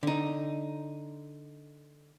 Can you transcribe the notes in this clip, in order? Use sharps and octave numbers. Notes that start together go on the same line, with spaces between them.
D3 D#4